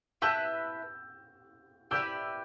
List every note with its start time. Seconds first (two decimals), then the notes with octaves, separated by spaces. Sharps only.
0.22 E4 B4 E5 A5 E6 G6
1.91 E4 G4 B4 D5 E6 G6